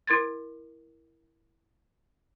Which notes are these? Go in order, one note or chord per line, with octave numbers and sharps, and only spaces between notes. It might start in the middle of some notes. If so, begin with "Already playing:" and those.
E4 A#4 C6 G#6 A6